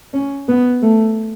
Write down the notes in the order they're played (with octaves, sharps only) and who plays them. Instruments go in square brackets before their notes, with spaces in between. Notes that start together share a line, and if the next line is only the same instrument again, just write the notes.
[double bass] C#4
B3
A3